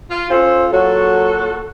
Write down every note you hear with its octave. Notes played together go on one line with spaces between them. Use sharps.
F4
C#4 F4 A4 C5
A#2 F#3 F#4 A4